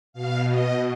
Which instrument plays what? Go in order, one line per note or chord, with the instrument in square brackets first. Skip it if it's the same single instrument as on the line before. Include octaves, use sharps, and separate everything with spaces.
[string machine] B2 F5
D#5